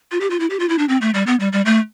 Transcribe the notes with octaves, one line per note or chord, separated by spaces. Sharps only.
F4
G4
F4
E4
G4
F4
E4
D4
C4
A3
G3
B3
G3
G3
A3